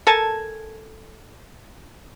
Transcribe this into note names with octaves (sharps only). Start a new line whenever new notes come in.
A4 A#4 G#5 A5